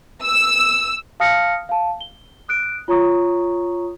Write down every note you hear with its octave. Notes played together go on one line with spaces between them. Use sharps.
E6
F5 A5 D#6 F6 A#6 C#7
F5 A5
G7
D#6 F#6 D7
F4 C#5 A#5 C#6 D#6